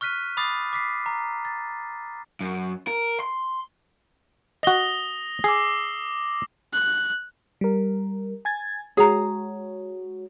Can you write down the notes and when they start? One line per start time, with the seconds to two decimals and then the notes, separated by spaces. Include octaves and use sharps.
0.01 C#6 F6 F#6 B6 D#7
0.37 B5 D6 D#6 A6 C7
0.73 D6 B6 C7
1.06 A#5
1.45 A6
2.41 F#2
2.87 A#4
3.20 C6
4.63 F#4 D#5 D#6 A#6 G7
5.44 G#4 D6 E6 C7
6.73 F#6
7.61 G3 A#4
8.45 G#5 G#6 A6
8.97 G#3 F#4 G#4 C#5 A#5